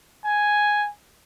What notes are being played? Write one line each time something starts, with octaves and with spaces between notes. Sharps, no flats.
G#5